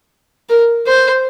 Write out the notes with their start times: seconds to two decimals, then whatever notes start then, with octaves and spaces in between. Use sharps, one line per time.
0.49 A#4
0.87 C5